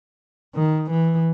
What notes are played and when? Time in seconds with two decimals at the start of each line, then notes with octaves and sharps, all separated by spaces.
0.55 D#3
0.90 E3